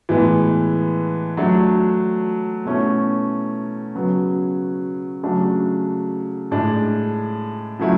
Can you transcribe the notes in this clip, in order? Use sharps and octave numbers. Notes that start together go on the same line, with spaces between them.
A2 E3 G#3 B3
F#3 A3 D4
B2 A3 C#4 E4
C#3 F#3 B3
C#3 F#3 A3 D4
A2 G#3 D4
C#3 F#3 A3 E4